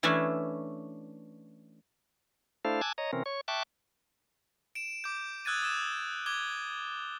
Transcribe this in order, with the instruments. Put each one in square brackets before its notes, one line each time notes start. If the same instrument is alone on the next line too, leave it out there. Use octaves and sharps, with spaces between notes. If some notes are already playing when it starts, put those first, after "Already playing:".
[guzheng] E3 A3 C#4 D4 C#5 E5
[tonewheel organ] A3 D4 E4 A4 C5 F5
G#5 A5 D6 E6 F#6 G#6
C#5 D#5 A#5
C3 E3 C4 C#4 A#4
C#5 C#6
E5 G5 A5 C#6 D6 F#6
[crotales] D7 E7
D6 G6
D#6 E6 F#6 G#6 A6 D#7
D#6 E6 E7
D6 G#6 G7